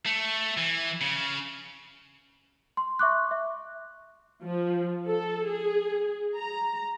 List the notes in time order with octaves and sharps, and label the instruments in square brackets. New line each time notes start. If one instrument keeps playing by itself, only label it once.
[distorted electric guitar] A3
E3
C#3
[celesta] C6
E5 C#6 D6 F#6
E5
[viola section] F3
A4
G#4
A#5